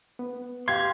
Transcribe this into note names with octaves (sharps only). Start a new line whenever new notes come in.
B3
G4 F5 C6 G#6